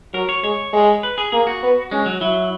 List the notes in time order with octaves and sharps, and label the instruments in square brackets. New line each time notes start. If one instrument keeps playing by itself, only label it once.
[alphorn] F#3 [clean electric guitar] A#4
[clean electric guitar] C#5
[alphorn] G#3 [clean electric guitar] C#5
[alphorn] G#3
[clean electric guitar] B4
G#4
[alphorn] A#3 [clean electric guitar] G#4
[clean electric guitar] F#4
[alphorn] B3
[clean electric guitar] G#3 [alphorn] C#4
[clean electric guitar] F#3
[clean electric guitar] F#3 [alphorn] E4